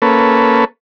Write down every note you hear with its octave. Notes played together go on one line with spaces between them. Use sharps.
A#3 C#4 A4 B4